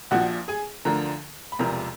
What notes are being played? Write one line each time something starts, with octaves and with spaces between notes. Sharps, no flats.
A#1 A#2 F3 F#4 F#5
G#4 G#5
D2 D3 F3 A#4 A#5
B5
E1 E2 C3 F3 A#4 A#5